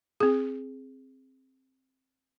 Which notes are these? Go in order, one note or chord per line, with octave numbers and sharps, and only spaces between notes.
C4 G#4